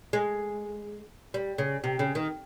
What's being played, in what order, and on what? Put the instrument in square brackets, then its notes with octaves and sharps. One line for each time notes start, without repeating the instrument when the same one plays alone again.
[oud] G#3
G3
C#3
C3
C#3
D#3